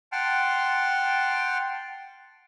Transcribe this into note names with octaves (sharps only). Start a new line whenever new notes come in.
F#5 G5 A5 C6 F6